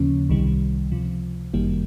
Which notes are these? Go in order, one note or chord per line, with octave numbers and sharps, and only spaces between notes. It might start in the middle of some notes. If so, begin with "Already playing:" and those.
Already playing: D#2 C#3 F3 A#3 C#4
C2 C3 D#3 G3
C#2 C3 F3
G1 F#2 D#3 G3 A#3